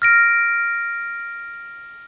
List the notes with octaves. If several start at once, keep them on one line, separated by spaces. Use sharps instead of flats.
F6 A#6 D7